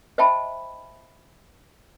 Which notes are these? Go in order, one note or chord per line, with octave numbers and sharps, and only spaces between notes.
C5 D#5 E5 G5 A5 B5